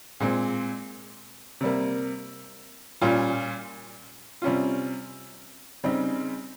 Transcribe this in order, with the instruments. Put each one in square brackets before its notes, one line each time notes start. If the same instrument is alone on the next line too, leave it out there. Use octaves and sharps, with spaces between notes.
[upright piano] A#2 G#3 C4
C3 G3 A#3
A#2 G3 C#4 F4
C3 G3 C#4 F4
C#3 G3 C4 D#4